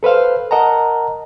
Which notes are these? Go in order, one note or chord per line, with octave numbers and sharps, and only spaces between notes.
A4 B4 C5 F5
A#4 D#5 F#5 A5 A#5